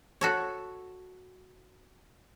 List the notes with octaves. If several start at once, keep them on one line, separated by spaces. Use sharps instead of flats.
F#4 A4 C#5